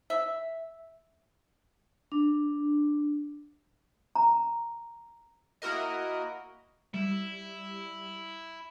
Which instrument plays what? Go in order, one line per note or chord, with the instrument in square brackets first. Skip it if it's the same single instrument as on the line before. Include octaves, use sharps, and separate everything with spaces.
[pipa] E5
[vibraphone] D4
[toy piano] A#5
[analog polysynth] A#3 E4 F#4 A#4 D#5
[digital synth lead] G3 [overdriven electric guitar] E4